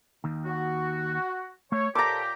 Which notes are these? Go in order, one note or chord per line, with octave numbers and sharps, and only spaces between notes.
D#2 D#3
F#4
A3 C#5
A#2 G4 A4 C5 A5 A#5 D6